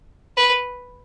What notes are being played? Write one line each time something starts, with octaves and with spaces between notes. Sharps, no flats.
B4